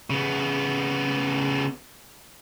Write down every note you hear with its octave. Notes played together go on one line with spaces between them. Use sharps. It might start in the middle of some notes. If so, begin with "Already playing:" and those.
C#3 B3